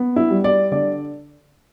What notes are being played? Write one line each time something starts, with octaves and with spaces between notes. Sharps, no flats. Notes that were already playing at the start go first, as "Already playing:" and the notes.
Already playing: B3
E4
G3
D5
D3 D5